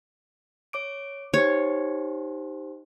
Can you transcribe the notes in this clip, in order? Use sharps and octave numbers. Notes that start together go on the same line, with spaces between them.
C#5 D6 D7
D#4 G4 C5 C#5